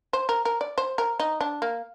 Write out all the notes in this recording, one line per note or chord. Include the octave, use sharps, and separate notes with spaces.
C5
A#4
A#4
D5
C5
A#4
D#4
D4
A#3